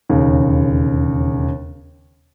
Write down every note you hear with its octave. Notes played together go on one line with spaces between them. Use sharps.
E1 D#2 C#3